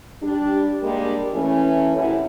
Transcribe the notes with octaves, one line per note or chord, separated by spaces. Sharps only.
G3 D4 G4
G3 G#3 A#3 D4 G4 A#4
E3 A3 C#4
F#2 C3 A3 E4